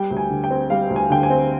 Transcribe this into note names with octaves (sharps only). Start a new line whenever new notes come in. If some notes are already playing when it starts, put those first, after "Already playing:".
Already playing: G3 G5
D2
G#5
D3
G5
C4
G3 F5
D2
G#5
D3 G5
G#5
C4